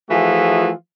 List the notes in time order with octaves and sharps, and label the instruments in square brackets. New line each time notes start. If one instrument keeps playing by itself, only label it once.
[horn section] E3 F3 A3 F4 F#4 G#4